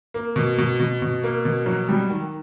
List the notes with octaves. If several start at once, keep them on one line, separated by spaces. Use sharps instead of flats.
A#3
B2
B2
B2
B2
A#3
B2
F#3
G3
D#3